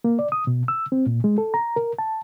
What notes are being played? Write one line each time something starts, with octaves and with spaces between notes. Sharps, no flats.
A#3
D5
D#6
B2
E6
C4
A#2
G#3
A4
A#5
A#4
A5